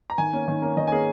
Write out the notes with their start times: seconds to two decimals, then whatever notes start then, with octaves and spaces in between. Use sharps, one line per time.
0.10 A#5
0.18 D#3 G#5
0.33 A#3 C#4
0.48 D#3
0.62 A#3 C#4
0.77 D#3 D#5
0.87 G#5
0.92 A#3 C#4 G#4